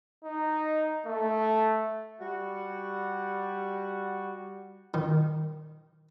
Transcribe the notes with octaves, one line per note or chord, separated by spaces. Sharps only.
D#4
A3
G3 F#4
D#3